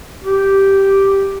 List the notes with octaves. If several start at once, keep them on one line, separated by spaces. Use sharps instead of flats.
G4